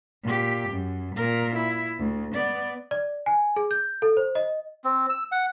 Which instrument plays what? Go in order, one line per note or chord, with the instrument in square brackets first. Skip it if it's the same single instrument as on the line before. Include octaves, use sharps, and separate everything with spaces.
[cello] A#2 G4
F#2
A#2 A#4
E4
D2
B3 D5
[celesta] D5
G#5
G#4
G6
A4
C5
D#5
[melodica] C4
E6
F#5